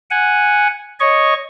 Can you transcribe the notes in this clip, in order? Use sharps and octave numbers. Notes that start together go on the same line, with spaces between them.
F#5 G#5
C#5 D#5 C#6